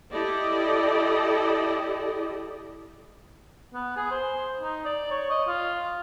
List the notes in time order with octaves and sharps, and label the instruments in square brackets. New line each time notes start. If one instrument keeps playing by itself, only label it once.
[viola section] E4 G4 A4 D5 D#5
[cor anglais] B3
G#4
C5
D#4
D5
C#5
D#5
F4